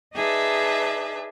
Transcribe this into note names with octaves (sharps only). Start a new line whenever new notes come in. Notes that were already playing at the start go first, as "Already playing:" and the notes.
D#4 G#4 B4 D5 E5 A5